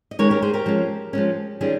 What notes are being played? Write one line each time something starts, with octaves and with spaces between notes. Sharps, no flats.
D#5
D#3 G#3 C#4 A#4 C#5
G4 A#4
G#4 C5
G4 A#4
F3 G#3 C#4
F3 G#3 C#4
D#3 G3 C#4 F4 G#4